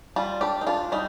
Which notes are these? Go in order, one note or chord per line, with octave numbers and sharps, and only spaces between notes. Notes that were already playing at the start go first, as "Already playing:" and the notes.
G3 F4
D4 G4
D#4
D4 F4
G3 D#4